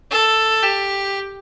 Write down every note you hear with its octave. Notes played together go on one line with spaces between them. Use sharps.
A4
G4